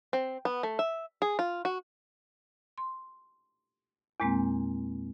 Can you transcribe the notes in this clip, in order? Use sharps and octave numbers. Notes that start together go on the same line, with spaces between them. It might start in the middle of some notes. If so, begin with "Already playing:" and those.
C4
B3
A3
E5
G#4
F4
F#4
C6
E2 A#2 G#3 A#3 C4